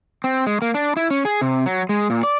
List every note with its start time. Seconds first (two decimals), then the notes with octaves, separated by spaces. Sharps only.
0.24 C4
0.47 G#3
0.62 A#3
0.74 D4
0.97 E4
1.11 C#4
1.25 G#4
1.41 C3
1.66 F#3
1.89 G#3
2.10 A#2
2.23 D5